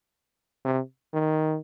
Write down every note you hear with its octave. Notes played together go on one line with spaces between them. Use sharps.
C3
D#3